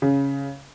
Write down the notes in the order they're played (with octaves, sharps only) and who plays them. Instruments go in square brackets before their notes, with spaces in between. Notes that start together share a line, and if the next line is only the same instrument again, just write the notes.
[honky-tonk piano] C#3